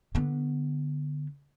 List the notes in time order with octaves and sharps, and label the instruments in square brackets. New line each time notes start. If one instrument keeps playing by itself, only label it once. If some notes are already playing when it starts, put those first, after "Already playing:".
[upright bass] D3 B3